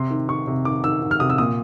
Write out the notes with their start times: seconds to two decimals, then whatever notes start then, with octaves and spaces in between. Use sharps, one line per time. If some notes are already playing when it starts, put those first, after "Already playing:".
Already playing: C3 C6
0.10 D#3
0.29 D#3 C#6
0.47 C3
0.65 D#3 D6
0.84 D#3 E6
1.02 D#3
1.11 F6
1.20 C3 D#6
1.30 E6
1.38 A#2 D#6